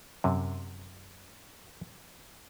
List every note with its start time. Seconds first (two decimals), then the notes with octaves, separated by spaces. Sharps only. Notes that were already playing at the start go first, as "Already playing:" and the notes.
0.24 F#2 C3